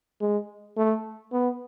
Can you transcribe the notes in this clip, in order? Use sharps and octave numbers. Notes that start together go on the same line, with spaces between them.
G#3
A3
B3